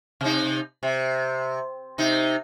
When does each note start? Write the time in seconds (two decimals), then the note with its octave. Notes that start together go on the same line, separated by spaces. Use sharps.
0.21 C3 D#4
0.83 C3
1.98 C3 D#4